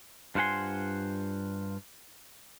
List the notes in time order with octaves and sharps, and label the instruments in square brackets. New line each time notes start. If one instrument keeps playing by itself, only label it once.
[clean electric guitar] G2 F4 C5 F#5 G#5 C6